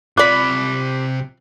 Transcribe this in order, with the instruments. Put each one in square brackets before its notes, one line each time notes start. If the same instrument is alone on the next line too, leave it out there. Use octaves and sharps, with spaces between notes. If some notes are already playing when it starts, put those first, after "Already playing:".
[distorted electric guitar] C3 B5 [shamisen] F4 D5 [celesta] D6 [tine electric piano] F#6 B6